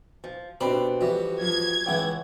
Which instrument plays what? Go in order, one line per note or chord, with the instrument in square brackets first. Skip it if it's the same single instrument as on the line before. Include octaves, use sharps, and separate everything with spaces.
[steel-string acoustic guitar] F3
[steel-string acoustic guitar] B2 C4 [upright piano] D4 B5 [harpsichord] G4
[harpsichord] F2 E3 G3 [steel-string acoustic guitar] F#4 [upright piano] G4
[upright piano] F3 [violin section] G#6
[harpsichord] C#2 E4 [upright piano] E3 F#5 G5